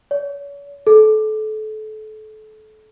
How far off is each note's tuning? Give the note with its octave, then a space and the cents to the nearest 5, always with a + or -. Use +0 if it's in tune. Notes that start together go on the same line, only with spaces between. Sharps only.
C#5 +40
A4 -30